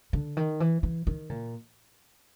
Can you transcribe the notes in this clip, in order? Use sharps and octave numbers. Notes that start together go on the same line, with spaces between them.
D3
D#3
E3
E3
D#3
A#2